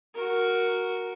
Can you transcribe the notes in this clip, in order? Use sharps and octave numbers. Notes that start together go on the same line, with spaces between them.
F#4 A#4